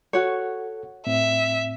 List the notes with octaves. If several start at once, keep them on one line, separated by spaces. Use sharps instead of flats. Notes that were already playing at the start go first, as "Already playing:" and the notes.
F#4 A4 C#5 F#5
A2 C4 E5